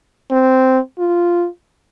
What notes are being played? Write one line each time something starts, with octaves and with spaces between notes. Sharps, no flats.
C4
F4